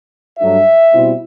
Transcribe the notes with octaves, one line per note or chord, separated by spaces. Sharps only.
G2 F#3 A3 D4 E5
B2 G3 C4 E4